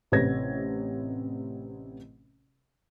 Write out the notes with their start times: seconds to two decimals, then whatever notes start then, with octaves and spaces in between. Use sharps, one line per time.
0.12 A1 C3 B4 C#5 G#6 A#6